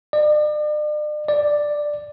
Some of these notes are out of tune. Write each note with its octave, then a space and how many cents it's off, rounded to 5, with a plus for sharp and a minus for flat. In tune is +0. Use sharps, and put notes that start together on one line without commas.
D5 +40
D5 +5